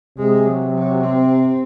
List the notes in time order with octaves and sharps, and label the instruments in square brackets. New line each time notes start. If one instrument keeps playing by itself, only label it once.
[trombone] C3 [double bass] G#3
[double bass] F#3
F#3
C4